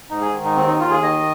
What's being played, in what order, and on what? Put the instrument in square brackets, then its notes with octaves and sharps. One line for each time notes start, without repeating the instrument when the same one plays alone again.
[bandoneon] G#2 D#4
G#4
D#3
D#4
D#2 C4
D#4
D#2 F4
G#4
D#3 D#5